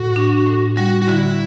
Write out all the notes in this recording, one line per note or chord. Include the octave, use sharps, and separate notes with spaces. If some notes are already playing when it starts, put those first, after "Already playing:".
Already playing: A2 F#4
D4
A2
G3 F#4
F#4
D3 E4